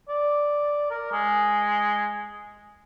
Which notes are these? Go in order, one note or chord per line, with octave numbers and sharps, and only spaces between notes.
D5
A#4
G#3